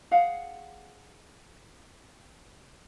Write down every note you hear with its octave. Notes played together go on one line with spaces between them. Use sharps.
G#4 F5 F#5